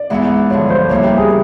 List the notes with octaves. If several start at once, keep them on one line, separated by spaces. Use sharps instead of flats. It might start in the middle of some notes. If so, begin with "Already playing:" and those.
Already playing: D5
G#2 E3 G#3 B3 E4
G2 D3 F3 C#5
C5
C#3 E3 G3 A#3 C#5
G4
G#4